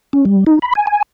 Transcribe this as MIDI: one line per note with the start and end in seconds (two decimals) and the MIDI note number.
0.13 0.25 61
0.25 0.44 55
0.47 0.59 63
0.62 0.73 83
0.75 0.86 80
0.87 1.02 80